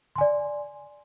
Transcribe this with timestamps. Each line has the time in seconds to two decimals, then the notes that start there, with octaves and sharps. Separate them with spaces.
0.16 C6
0.18 G#5
0.21 D5